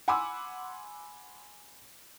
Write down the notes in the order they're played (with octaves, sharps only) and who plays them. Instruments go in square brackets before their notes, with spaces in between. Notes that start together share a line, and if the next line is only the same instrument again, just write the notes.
[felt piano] F#5 G#5 B5 C6 D6 E6